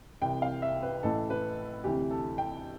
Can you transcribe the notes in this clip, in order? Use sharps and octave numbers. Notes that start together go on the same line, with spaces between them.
C2 C3 E3 G5
F5
E5
B4
A1 A2 E3 A4
B4
D2 C3 E3 G4
A4
G5